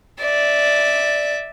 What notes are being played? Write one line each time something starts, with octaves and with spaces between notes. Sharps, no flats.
D5 E5